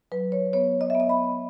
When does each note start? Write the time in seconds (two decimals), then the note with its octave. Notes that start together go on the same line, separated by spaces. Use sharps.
0.12 F#3 B4
0.32 C#5
0.53 B3 C#5
0.81 D#5
0.90 E5
0.95 B3
1.00 D#5
1.09 B5